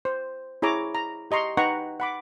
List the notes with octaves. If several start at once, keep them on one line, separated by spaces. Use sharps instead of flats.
C5
E4 G#4 C#5 A#5 D6
A#5
G4 D#5 A#5 C6 C#6
D#4 B4 F#5 G5 A#5 C#6
F#5 B5 D6